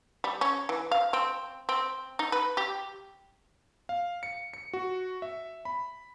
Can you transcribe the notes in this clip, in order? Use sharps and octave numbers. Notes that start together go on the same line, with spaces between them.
G3
C#4
E3
F5
C4
C4
D#4
B4
G4
F5
C#7
C#7
F#4
E5
B5